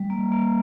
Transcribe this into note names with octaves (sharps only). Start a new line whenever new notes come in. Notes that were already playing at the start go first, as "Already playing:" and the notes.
Already playing: G3
A#3
A#3